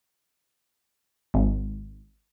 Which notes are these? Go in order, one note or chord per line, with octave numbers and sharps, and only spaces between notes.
G#1